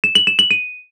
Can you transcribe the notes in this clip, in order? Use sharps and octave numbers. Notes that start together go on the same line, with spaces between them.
E7
F#7
E7
F#7
D#7